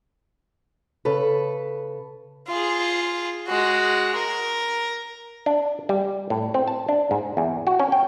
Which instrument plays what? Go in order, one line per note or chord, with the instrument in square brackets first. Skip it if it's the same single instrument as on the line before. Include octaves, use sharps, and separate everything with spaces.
[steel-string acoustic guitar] C#3 A4 B4
[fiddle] F4 G#4
G#3 F#4
A#4
[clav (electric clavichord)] D4
G3
A2
C4
A5
D4
G#2
E2
F#4
C#4
G5